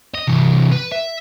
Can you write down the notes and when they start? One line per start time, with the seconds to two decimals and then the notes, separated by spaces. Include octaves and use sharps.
0.15 D#5
0.27 C3 E3
0.71 B4
0.92 E5